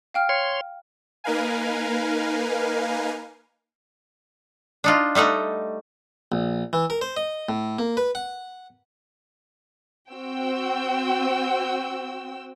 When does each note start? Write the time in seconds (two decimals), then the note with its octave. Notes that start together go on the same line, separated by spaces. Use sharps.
0.14 F5 G5 F6
0.29 C#5 C6
1.24 A#3 D#4 A#4 B4 F5 G#5
4.84 D4 D#4 F4
5.15 G3 A3 D#4 F#5
6.32 A#1
6.73 E3
6.90 A#4
7.01 C5
7.17 D#5
7.49 A2
7.79 A#3
7.97 B4
8.15 F#5
10.12 C4 F#4 G5 E6